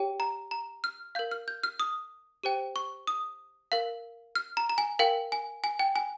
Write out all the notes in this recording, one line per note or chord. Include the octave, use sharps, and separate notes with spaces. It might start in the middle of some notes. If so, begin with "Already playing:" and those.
Already playing: G4 C#5 G5
A#5
A#5
F6
A#4 F5 G6
F6
G6
F6
D#6
G4 C5 G5
C#6
D#6
A#4 F5
F6
A#5
A#5
G#5
A#4 F5 G5
G#5
G#5
G5
G#5